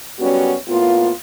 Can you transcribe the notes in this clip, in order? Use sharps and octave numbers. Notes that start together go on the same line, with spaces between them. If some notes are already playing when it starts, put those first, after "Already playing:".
F#2 G3 B3 C#4 F#4
A2 A#3 B3 F4